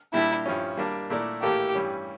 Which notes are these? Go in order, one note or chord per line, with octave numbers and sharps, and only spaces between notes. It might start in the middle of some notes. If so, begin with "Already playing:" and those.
A#2 G3 D4 E4 G4
G2 F3 C#4
G3 A#3 D4
A#2 A3 E4 A#4 D5
A2 E3 A#3 E4 G4 A4
G2 E3 G3 C#4